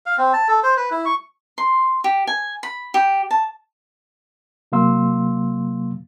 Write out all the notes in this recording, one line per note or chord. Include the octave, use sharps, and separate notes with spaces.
F5
C4
A5
A4
C5
B4
E4
C#6
C6
G4
G#5
B5
G4
A5
C3 F#3 A#3 F5 C6 E6